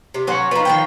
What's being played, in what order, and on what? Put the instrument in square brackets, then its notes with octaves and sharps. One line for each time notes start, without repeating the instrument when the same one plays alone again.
[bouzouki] C3
[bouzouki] F#3 C#4 [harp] C5 F#5 C#6
[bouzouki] F3 D#4 [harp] B4
[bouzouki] D#3 F3 G5